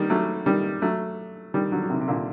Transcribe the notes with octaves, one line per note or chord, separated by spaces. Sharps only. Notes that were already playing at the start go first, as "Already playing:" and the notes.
Already playing: D#3 G3
F#3 A3
D#3 G3
F#3 A3
D#3 G3
D3 F#3
F#3
C3 D#3
C3
A#2 D3